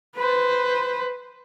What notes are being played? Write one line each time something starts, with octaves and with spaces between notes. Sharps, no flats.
B4 C5